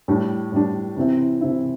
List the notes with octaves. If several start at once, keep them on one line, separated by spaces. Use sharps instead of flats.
A2 G3 D4
A2 G3 D4
C3 E3 C4 E4
C3 E3 C4 E4